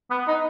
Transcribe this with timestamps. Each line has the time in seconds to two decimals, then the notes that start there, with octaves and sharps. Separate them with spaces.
0.11 B3
0.28 D#4